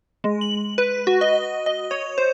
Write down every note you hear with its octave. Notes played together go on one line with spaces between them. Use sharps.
G#3
F#7
B4
F#4
D#5
D#5
C#5
C5